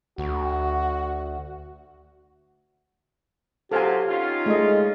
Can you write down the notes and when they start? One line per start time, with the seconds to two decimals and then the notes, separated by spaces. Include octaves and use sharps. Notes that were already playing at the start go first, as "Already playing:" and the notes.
0.18 D2 F#4
3.72 C3 F#3 F4 G4 A4 C5 G#5
4.08 C#4 D#4 F4
4.46 G#3 A3 D#5